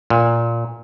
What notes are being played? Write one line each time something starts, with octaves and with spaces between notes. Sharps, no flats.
A#2